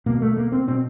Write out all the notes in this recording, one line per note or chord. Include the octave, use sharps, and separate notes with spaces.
B2 A#3
A3
A#3
C4
B2 C4